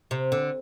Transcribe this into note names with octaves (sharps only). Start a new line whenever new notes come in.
C3
D3